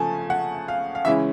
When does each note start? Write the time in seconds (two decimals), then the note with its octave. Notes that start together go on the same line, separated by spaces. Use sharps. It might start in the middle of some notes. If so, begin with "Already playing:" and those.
Already playing: C#3 F3 A3 G#5 A5
0.30 F#5
0.68 F5
0.95 F5
1.05 C#3 E3 G#3 C#4 E4 E5